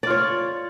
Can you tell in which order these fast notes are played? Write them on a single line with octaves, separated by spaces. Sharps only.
D5 F4 C#5